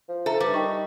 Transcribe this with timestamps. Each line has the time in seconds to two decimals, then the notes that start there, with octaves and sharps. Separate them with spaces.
0.09 F3
0.26 A4 E5 A#5
0.40 G2 G3
0.54 D#4 A#4 G5 C#6